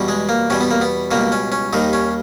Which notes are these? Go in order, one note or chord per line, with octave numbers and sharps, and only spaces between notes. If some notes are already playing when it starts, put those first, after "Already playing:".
Already playing: E2 B2 G3
G#3
A#3
E2 B2 G3 C#4
B3
A#3
B3
C#2 B2 G3 A#3
C#4
C#4
D#2 D#3 G3 D#4
C#4